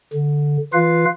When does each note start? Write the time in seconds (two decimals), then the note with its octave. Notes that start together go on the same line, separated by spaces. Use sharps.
0.14 D3
0.73 E3 F4 B4 F5